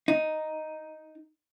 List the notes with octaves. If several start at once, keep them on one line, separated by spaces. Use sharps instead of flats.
D#4